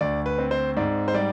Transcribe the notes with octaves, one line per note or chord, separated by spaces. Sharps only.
D2 D5
B4
C4
C5
G#2 D5
C5
G3 D5